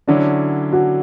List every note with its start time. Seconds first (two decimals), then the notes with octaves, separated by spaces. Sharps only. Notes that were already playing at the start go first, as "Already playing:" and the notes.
0.08 D3 F#3 C#4 D4 E4
0.73 F#4